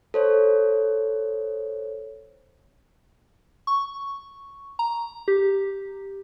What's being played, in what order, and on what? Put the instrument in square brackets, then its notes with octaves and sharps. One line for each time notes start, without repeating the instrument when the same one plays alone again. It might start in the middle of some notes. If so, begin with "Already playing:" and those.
[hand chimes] A4 C5 C#5
[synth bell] C#6
A#5
G4